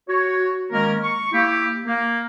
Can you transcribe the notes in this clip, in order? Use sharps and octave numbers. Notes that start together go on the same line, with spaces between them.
F#4 C#5
D#3 G#3 A#3 C#4 A#4
C#6
A#3 E4 G4
A#3